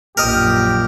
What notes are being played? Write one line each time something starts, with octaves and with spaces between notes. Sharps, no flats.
A#1 F#2 G4 A#4 D#5